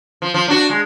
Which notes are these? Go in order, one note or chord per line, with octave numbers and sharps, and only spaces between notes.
F3
F3
D4 F#4
G#3